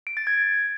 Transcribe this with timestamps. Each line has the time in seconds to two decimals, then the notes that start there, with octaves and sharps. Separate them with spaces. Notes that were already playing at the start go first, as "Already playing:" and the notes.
0.07 D7
0.17 A6
0.27 G#6